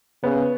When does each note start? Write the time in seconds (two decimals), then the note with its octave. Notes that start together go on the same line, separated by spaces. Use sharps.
0.23 C#3 B3